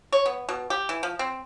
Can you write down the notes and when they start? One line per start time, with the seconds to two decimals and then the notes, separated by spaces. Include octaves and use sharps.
0.12 C#5
0.26 B3
0.49 B2
0.70 G4
0.89 E3
1.03 F3
1.19 C4